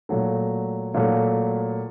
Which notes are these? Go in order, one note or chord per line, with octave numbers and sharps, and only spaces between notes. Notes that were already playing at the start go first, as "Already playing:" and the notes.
A#2 F#3 A3
A#2 F#3 A3